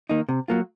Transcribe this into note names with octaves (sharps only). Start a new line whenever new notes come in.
D#3 A#3 D#4
C3
F#3 A#3 F4